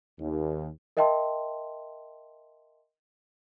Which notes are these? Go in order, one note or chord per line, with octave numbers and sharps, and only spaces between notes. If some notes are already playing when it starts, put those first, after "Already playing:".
D#2
A#4 D#5 E5 G5 A5 C6